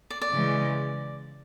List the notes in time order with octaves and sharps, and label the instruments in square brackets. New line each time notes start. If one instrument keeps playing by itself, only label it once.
[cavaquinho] D5
D5
[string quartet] C#3 E3 G#3